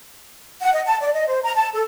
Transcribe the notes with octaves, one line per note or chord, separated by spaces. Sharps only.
F#5
D#5
A5
D5
D#5
C5
A#5
A5
A4